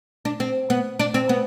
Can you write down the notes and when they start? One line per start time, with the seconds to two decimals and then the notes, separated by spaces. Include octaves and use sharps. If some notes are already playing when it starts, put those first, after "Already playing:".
0.25 D4
0.40 C4
0.70 B3
0.99 D4
1.14 C4
1.29 B3